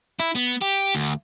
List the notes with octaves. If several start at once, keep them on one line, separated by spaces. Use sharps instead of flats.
E4
B3
G4
D2